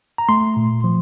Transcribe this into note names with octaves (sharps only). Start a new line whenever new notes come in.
A#5
A3 C6
A#2
F3